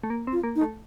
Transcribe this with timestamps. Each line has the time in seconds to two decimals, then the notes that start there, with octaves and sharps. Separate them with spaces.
0.03 A3
0.10 A#3
0.27 C4
0.32 F4
0.43 A#3
0.56 D#4
0.61 A3